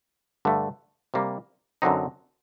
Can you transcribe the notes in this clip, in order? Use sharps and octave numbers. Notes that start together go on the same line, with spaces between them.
G2 D3 A3
C3 G3 A#3
F#2 D3 F#3 C4 D#4